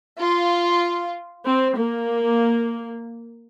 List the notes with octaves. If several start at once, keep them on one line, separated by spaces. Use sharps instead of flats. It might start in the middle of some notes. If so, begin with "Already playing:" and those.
F4
C4
A#3